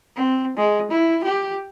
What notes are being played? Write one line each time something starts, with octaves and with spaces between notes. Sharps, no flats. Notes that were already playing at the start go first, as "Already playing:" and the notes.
C4
G#3
E4
G4